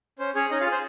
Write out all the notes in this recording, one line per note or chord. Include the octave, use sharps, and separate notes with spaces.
C#4 C5
C#4 G#4 C#5
C#4 D#4 D#5
F4 F5
G#4
C5